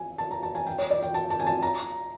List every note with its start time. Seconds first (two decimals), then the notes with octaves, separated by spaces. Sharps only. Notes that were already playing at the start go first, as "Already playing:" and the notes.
Already playing: G#5
0.18 A5
0.31 A#5
0.43 A5
0.55 G#5
0.66 G5
0.78 C#5
0.91 D5
1.03 G5
1.14 A5
1.30 A5
1.40 G#5
1.46 A5
1.62 A#5